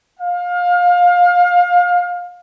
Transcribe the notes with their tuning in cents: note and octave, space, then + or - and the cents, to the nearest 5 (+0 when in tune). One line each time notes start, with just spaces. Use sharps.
F5 +25